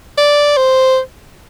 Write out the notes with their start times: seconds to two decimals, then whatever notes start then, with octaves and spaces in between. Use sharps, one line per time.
0.18 D5
0.57 C5